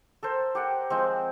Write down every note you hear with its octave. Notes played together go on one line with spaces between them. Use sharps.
A4 A#4 C5
G4 A#4 F#5
F3 G#3 C4